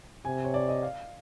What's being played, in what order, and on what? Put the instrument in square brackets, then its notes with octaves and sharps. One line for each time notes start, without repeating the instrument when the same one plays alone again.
[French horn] C3 [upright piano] G#5
[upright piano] C#5
D5
D#5
F5